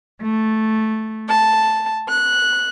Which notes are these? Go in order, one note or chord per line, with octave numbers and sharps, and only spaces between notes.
A3
A5
F#6